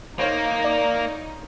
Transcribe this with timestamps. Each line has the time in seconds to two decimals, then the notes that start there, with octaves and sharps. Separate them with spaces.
0.19 A#3 D#4 C5 C#5 F5
0.64 D5